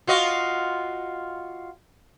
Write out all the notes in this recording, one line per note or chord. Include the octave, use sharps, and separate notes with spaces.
F4 F#4 D#5